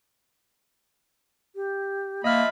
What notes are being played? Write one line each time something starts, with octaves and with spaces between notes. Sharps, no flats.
G4
F3 A#3 D#5 E5 B5 F6